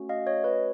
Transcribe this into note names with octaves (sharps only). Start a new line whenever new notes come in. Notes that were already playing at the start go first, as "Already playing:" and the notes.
Already playing: A3 C#4 F#4
D#5 F5
C#5 D#5
B4 C#5